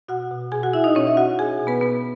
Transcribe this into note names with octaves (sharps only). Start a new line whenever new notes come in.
B2 F#4 F#5
B2
B2 G#4 G#5
F#4 F#5
B2 E4 E5
D#4 D#5
B2 C#4 C#5
E5
B2 F#4 F#5
B2 G#4 G#5
B2
B3 B4
B2 B3 B4